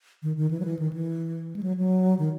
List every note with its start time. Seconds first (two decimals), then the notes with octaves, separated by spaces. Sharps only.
0.23 D#3
0.37 D#3
0.51 E3
0.60 F#3
0.65 E3
0.79 D#3
0.93 E3
1.56 G#3
1.63 F#3
1.77 F#3
2.19 D#3